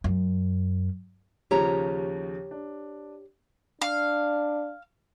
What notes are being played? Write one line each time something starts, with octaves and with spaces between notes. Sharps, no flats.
F#2
D#2 C#3 F3 G4 C#5 A#5
D4
D4 F5